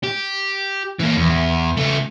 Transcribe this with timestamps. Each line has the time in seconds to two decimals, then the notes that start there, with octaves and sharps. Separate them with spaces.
0.03 G4
1.00 E3 A#3
1.17 E2
1.30 E2
1.77 C#3 A3